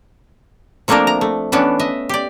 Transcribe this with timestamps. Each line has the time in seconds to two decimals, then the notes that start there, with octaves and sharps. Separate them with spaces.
0.88 F3 A3 A#3 C4 D4 A#4
1.07 A#5
1.21 A3
1.52 E3 B3 C#4 D4
1.79 D#5 E5
2.09 G4 D5